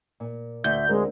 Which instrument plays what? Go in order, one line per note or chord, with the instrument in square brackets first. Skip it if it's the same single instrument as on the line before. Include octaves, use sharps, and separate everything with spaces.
[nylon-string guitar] A#2
[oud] D2 [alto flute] E5 [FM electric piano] G6
[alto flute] G#3 [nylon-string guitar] C4 A#4